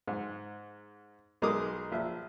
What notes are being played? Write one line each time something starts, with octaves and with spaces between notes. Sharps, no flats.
G#2
B1 G#3 D#4 A#4 D6 D#6
A#1 E5